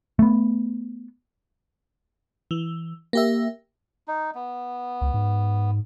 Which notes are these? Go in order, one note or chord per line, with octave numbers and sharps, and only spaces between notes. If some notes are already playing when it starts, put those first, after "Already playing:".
A3 B3
E3
A#3 G4 E5
D#4
B3
C#2
G#2